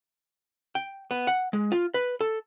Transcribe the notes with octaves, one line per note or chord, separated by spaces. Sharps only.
G5
B3
F#5
G#3
F4
B4
A4